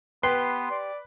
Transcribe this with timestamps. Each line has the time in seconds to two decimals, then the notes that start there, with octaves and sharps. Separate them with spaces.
0.23 B3 G4 B4 C6
0.71 D5